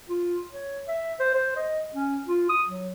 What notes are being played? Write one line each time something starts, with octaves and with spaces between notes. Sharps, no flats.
F4
C#5
E5
C5
C5
D#5
C#4
F4
D#6
F#3